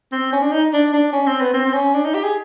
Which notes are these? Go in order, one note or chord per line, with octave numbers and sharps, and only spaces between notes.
C4
C#4
D4
D#4
D4
D4
C#4
C4
B3
C4
C4
C#4
D4
D#4
G4
G#4